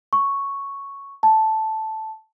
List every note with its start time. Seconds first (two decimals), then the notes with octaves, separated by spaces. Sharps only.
0.13 C#6
1.23 A5